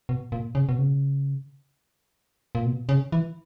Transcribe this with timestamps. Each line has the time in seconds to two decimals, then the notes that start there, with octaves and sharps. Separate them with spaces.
0.09 B2
0.32 A#2
0.55 C#3
0.69 B2
0.78 C#3
2.55 A#2
2.65 B2
2.89 C#3
3.12 E3